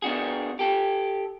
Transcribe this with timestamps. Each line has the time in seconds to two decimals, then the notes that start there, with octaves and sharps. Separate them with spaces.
0.02 B3 D4 F#4 G#4
0.59 G4 A4